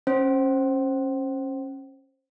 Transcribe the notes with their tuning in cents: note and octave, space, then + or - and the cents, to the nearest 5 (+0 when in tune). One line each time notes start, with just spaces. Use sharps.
C#4 -25 C5 +10